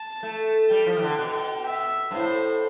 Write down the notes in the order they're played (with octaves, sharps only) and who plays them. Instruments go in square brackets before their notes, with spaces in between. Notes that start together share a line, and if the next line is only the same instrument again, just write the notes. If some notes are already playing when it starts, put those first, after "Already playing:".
Already playing: [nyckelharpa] A5
[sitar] A3
[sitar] G3 [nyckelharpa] G5
[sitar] F3
E3
D3
B2
[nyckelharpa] E5
[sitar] G2
[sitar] A2 [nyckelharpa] C5